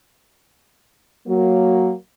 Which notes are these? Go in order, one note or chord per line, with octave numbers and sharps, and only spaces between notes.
F#3 A#3